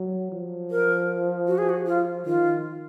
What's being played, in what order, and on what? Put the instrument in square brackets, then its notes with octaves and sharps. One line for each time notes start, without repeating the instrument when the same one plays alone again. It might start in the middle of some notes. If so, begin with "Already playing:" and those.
Already playing: [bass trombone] F#3
F3
[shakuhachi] A#4
F#4
G#4
F#4
F4
[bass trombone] D#3 [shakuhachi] F4